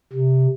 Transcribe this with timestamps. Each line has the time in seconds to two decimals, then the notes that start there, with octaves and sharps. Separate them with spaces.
0.13 C3